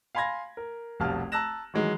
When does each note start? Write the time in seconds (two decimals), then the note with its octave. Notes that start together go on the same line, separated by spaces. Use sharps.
0.15 F5 G#5 B5 C6 G#6 A#6
0.57 A#4
1.00 F1 C2 B2 F5 A5 F6
1.32 A5 A#5 E6 F#6 A#6 E7
1.74 D#3 E3 F#3 G#3